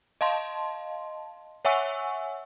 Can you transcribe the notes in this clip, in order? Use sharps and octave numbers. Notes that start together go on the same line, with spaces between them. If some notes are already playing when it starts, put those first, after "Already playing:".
D#5 F5 A5 C6
C#5 E5 F#5 G#5 C#6 E6